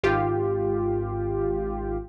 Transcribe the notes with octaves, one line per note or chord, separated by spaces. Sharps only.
G#1 F4 G4